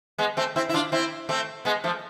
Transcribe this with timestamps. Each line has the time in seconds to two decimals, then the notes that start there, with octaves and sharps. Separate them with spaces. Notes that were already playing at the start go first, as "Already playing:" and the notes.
0.18 G#3 B3
0.37 A3 C4
0.56 C4 E4
0.69 E4
0.74 D4 F4
0.92 C4 E4
1.29 A3 C4
1.65 G#3 B3
1.84 F3 A3